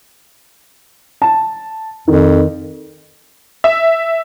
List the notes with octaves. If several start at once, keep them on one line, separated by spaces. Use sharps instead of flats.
A5
F2 D#3
E5